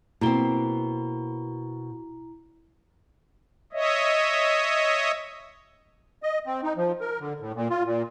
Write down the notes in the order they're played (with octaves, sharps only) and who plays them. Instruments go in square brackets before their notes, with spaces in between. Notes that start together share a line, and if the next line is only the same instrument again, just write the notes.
[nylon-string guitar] B2 A#3 C4 [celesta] E4 A#5 G7
[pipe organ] C#5 D#5 E5
[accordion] D#5
C4
D#4
F3
A#4
D3
A2
A#2
F4
A#2